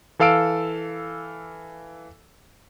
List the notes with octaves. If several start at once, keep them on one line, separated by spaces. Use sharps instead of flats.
E3 A4 F5 E6 D7